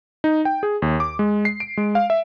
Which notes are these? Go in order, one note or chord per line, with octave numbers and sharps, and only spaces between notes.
D#4
G5
G#4
D#2
D6
G#3
C7
D7
G#3
F5
E5